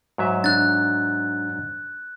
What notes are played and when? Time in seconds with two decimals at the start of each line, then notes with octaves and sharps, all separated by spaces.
0.18 G#2 F#3 E5
0.44 D4 F#6 A6